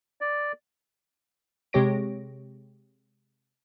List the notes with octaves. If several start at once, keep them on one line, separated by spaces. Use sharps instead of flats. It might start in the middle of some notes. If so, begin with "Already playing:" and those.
D5
C3 G#3 G4 C#5 A#6 D7